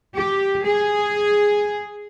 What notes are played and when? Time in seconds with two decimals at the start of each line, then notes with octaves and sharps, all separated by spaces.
0.15 G4
0.66 G#4